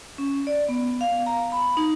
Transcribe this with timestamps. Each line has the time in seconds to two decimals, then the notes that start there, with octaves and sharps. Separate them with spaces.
0.18 C#4
0.47 D5
0.69 B3
1.01 F5
1.26 A#5
1.52 B5
1.77 D#4